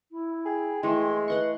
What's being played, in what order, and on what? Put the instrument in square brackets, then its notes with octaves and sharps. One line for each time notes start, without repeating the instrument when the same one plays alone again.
[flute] E4
[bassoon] G#4 [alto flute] G5
[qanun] E3 A3 [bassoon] G#3 [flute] C6
[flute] B4 [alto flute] D#5 [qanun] F#5 C6 C#6